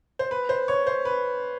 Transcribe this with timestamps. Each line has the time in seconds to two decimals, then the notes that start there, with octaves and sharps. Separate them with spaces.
0.19 C5
0.31 B4
0.49 C5
0.68 C#5
0.87 C5
1.05 B4